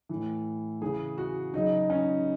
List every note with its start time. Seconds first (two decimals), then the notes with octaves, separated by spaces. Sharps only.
0.09 A2 E3
0.81 C#3 E3 G#4
1.18 F#4
1.54 C#3 F#3 D#4
1.90 C#4